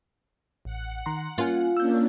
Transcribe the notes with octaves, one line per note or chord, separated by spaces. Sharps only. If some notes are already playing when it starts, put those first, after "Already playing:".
A1 F#5
D#3 A#5 C6
A#3 C#4 F4 G#5
A#3 C#4 D4 E6 G6